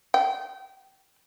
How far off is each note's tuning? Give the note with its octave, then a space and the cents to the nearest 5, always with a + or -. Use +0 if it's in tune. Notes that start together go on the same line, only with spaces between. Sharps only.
G5 -30